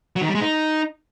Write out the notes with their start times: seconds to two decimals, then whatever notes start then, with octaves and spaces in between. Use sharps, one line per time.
0.16 F#3
0.22 D#3
0.28 G3
0.35 G#3
0.41 D#4